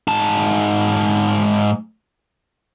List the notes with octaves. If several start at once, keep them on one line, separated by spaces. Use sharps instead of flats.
G#2 A5